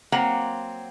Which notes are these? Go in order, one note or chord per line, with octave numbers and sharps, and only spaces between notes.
F#3 A#3 C4 F#5 A#5